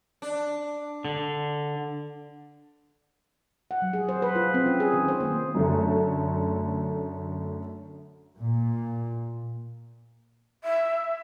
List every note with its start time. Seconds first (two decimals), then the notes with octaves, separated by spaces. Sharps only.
0.22 D4
1.05 D3
3.71 F#5
3.82 F#3
3.93 G#4
4.09 C5
4.22 B4
4.35 F4
4.54 C4
4.66 C#4
4.80 G#4
4.94 D#3
5.08 C5
5.20 A#3
5.55 F#2 D3 A3
8.38 A#2
10.64 E5